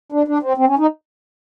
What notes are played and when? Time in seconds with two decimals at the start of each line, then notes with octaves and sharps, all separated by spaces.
0.12 D4
0.28 D4
0.43 C4
0.58 C4
0.67 C#4
0.79 D#4